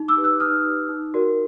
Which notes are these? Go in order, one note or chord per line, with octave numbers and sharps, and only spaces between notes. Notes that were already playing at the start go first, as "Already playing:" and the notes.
Already playing: D#4
D6 E6
G4 B4
E6 F#6
D#4 D#6 F6
G4 B4
D#4
F#4 A#4 D5